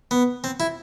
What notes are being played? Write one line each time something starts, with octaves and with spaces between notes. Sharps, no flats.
B3
C4
E4